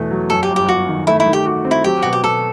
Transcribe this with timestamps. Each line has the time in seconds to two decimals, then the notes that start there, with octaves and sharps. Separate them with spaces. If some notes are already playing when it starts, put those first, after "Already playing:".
Already playing: E2 B2 A3 B3
0.11 F#3
0.30 F#2 A4
0.43 G4
0.50 G1
0.56 G4
0.69 G1 F#4
0.88 D#3
1.07 A3 E4
1.20 E4
1.26 D#3
1.33 G4
1.46 F#4
1.65 C4
1.71 E4
1.84 F#3 G4
2.02 B2 F#4
2.13 G4
2.24 B2 A4